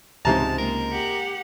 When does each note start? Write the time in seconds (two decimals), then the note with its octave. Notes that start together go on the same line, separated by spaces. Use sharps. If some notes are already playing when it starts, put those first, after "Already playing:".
0.25 C#2 G#2 C3 A5 A#5
0.58 G#3 A#3 A#4
0.91 G4 F#5